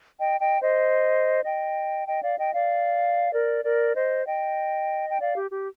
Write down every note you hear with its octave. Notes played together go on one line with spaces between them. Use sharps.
D#5 G5
D#5 G5
C5 D#5
D#5 G5
D#5 G5
D5 F5
D#5 G5
D5 F5
A#4 D5
A#4 D5
C5 D#5
D#5 G5
G5
D5 F5
G4
G4